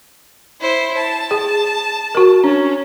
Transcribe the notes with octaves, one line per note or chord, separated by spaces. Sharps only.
E4 C5
A5
G#4
F#4 A#4
C#4 D4